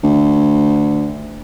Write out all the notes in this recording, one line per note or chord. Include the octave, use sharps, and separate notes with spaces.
D2